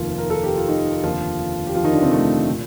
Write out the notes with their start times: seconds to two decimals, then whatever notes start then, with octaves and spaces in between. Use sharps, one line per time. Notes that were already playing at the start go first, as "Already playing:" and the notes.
Already playing: F1 D#2 D#3 F3 F4
0.18 A#4
0.30 A4
0.43 G4
0.56 F4
0.68 D#3 D#4
1.03 F1 D#2 D3 F3 F4
1.67 G4
1.75 F3 F4
1.84 D#3 D#4
1.93 D3 D4
2.02 C3 C4
2.11 A3
2.50 A#2